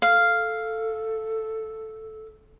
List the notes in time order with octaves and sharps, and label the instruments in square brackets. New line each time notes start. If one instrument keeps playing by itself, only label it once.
[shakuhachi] A4 [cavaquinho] F5